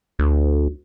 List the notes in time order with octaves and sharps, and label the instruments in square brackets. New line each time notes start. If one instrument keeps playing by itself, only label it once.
[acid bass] D2